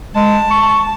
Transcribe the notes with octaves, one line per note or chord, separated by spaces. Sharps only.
G#3 A5
C#6